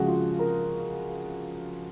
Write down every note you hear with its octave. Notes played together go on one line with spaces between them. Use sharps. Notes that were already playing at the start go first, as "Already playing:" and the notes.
Already playing: C#3 F3 G#3 F#4 G#4
F4
A#4